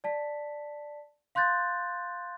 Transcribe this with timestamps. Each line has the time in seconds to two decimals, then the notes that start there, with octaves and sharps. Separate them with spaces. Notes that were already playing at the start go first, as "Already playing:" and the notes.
0.04 D5 A5 B6
1.35 F5 C6 F#6 G6 A6